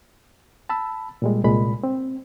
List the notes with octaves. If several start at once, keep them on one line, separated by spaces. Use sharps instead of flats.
A5 B5 E6
A#2 G3 G#3
C2 A#2 G#3 B5
C4